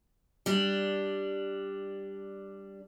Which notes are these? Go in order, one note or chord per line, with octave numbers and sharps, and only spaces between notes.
G3 D4